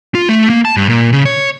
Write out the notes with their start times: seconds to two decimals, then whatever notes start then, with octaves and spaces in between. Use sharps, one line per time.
0.15 F4
0.29 A3
0.50 A#3
0.65 A5
0.77 G2
0.89 A#2
1.13 C#3
1.25 C#5